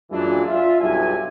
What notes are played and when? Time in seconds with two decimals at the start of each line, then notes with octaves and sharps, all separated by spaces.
0.11 F#2 A#2 E3 G#3 D4 F4
0.45 F4 E5
0.81 B1 G2 E4 G#5